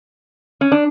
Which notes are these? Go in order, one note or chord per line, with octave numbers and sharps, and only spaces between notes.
C#4
D4